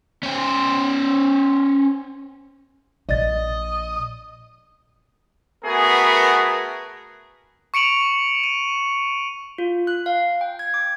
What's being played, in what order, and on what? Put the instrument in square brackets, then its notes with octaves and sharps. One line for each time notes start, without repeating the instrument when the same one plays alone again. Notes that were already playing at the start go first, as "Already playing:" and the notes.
[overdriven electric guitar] C#4 C5
[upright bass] A#1 [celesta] D5 A6 [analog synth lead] D#5
[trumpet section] A3 B3 F#4 G#4 A#4 B4
[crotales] C#6 C#7 D7 F7 F#7
D#7
[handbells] F4
F#6
F5
G5
G#6
D6